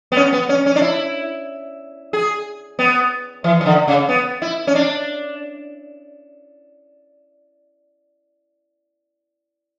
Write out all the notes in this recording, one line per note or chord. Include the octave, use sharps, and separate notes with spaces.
B3
C#4
B3
C#4
C#4
D4
E4
G#4
B3
E3
E3
D3
C#3
B3
E4
C#4
D4